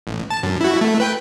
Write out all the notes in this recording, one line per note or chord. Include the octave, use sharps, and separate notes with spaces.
A1
A5
F#2
E4 F#4
A3
B4 G5